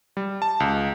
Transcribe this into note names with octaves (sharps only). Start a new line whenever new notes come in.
G3
A5
C#2